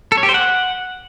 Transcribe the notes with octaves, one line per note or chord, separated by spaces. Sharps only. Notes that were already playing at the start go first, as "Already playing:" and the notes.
A4
C#5
G4
C5
F#5